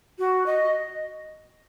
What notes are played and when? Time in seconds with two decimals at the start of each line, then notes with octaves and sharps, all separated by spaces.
0.19 F#4
0.46 D#5